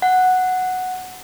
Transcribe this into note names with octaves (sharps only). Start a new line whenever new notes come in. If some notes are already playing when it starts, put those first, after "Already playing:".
F#5